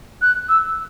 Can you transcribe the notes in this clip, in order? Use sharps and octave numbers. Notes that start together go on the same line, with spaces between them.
F#6
E6